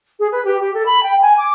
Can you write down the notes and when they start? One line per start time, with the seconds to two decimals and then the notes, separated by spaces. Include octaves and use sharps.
0.20 G#4
0.32 B4
0.45 G4
0.60 G4
0.74 A4
0.86 B5
1.03 G5
1.22 G#5
1.38 D6